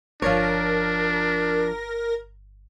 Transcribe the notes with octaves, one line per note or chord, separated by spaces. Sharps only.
G1 F3 D4 A#4 C#5